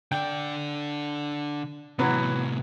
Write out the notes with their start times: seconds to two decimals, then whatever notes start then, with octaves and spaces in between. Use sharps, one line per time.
0.12 D3 D5 G5
1.99 A2 C3 E3 F#3 B3